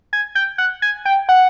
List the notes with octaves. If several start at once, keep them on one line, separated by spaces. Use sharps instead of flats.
G#5
G5
F#5
G#5
G5
F#5